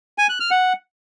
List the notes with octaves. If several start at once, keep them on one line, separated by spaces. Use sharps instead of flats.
G#5
F#6
F6
F#5